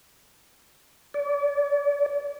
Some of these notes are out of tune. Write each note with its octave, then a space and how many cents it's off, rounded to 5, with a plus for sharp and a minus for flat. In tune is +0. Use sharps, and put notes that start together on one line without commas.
D5 -40